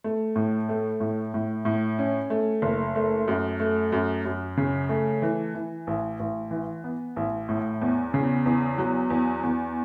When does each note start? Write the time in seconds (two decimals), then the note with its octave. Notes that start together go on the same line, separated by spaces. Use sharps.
0.04 A3
0.36 A2
0.69 A3
1.00 A2
1.34 A2
1.65 A2
1.99 C#4
2.30 A3
2.62 F#1
2.95 A3
3.28 F#2
3.60 A3
3.92 F#2
4.25 F#2
4.57 C#3
4.89 A3
5.22 E3
5.54 E3
5.87 A1
6.20 A1
6.51 E3
6.84 B3
7.16 A1
7.49 A2
7.81 E2
8.14 C#3
8.46 E2
8.78 F#3
9.10 E2
9.43 E2